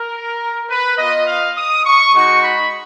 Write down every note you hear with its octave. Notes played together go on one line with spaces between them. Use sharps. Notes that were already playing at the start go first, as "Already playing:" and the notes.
Already playing: A#4
B4
B3 F4 D#5
F5
D#6
C#6
G#3 D#4 F#4 C#6
B5